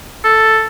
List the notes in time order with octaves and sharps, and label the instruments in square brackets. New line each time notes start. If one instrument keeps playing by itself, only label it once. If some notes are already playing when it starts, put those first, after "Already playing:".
[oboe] A4